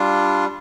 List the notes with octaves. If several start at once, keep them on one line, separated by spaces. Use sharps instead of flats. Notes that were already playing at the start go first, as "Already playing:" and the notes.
Already playing: G3 D4 F4